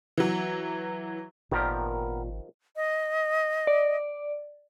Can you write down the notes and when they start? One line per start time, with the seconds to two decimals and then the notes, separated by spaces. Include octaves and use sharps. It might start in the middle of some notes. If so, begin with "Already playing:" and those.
0.17 E3 F#3
1.52 G#1 A#2 D#3 F3 B3 G4 A#4
2.76 D#5
3.67 D5